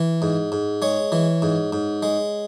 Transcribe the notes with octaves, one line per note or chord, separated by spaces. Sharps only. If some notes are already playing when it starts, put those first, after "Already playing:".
Already playing: E3
G#2
G#2
G#3 C#5
E3
G#2
G#2
G#3